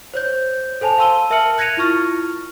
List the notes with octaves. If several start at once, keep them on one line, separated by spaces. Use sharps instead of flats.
C5 C#5 G6
A4 C5 G#5 A5 F7
F5 A5 C6 E6 D#7 G7
A#4 E5 A5 F6 C#7 F#7
F#6 G#6 A#6 C#7 D#7 F7
E4 F4 C#6 F6 A6